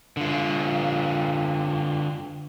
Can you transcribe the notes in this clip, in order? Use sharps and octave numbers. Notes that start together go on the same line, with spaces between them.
D3 F4